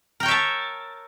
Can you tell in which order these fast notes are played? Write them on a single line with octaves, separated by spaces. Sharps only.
A#4 G5 C#5 E5 A5